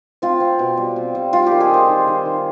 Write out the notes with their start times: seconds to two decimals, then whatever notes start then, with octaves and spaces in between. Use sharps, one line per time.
0.22 C4 F4
0.40 C4
0.59 B2
0.77 G3
0.96 C4
1.15 G3
1.33 G3 F4
1.47 D#3 G4
1.61 G#4
1.70 D#3 C5
1.88 D#3
2.07 D#3
2.25 D#3